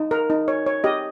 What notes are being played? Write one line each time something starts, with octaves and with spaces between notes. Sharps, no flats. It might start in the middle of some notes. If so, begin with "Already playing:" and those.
Already playing: D#4
A#4
D#4
C#5
C#5
G4 D#5